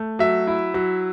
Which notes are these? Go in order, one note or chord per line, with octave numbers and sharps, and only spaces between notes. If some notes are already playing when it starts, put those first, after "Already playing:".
Already playing: A3
F#3 E5
E4
F#3